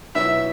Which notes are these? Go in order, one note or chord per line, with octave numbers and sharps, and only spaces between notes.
B2 F#3 B3 E4 E5